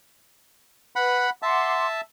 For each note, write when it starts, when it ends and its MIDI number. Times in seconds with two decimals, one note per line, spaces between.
0.96 1.25 71
0.96 1.30 78
0.96 1.30 83
1.42 2.01 76
1.42 1.86 78
1.42 2.01 81
1.42 1.86 84
1.42 1.86 86